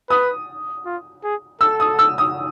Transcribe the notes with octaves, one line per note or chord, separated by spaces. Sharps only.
B4 D#6
F4
G#4
A4 E6
D#6
E6
D#6